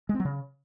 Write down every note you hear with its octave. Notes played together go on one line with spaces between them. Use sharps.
G#3
C4
F#3
C#3